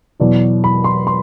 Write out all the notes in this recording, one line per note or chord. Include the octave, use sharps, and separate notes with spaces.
E2 B2 F#3 D5
B5
C6
C6